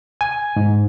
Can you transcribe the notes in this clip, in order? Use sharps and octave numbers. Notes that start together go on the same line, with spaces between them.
G#5
G#2